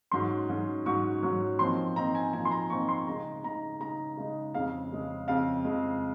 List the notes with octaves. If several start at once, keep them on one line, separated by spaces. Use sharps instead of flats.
G#2 F#3 C#4 C6
G#2 F#3 C#4
G#2 F#3 C#4 C#6
G#2 F#3 C#4
A#2 F3 C4 D#4 C6
A#2 F3 C4 D#4 A#5
G#5
A#2 F3 C4 D#4 G#5
C6
A#5
A#2 F3 C4 D#4 C#6
C6
C#3 G#3 D#4 A#5
C#3 G#3 D#4 A#5
C#3 G#3 D#4 A#5
C#3 G#3 D#4
F2 C#3 G#3 F5
F2 C#3 G#3
F2 C#3 G#3 F5
F2 C#3 G#3